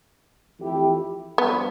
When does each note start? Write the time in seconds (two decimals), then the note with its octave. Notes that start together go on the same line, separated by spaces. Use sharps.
0.60 F2 E3 A3 E4 G4
1.38 G2 D3 F3 B3